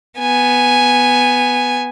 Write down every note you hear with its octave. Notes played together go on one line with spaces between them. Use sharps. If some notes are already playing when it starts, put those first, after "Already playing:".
B3 G#5